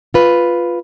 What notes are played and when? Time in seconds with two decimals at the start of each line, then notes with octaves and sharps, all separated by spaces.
0.14 F4 B4